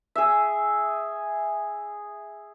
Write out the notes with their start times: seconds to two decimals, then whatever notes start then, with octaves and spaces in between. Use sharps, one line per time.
0.15 G#4 E5